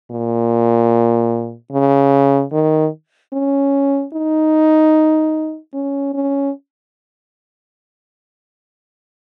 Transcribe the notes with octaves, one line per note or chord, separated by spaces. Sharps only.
A#2
C#3
D#3
C#4
D#4
C#4
C#4